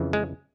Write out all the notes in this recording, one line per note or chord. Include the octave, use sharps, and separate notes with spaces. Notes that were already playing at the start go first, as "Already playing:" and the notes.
Already playing: F2 C#3 E3
G#3